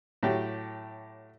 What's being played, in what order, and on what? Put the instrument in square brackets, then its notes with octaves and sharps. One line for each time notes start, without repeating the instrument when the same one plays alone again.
[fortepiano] A2 F#3 G4